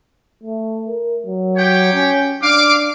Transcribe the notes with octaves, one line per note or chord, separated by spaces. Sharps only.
A3
A#4
F#3
G4 C#5 G5
C#4
D4 F5 D6